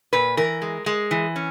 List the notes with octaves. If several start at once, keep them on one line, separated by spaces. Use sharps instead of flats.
A#2 B4
E3 A#4
G#3
G#3
E3
C#4